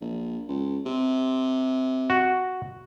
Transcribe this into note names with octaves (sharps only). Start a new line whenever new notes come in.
A#1
C#2
C3
F#4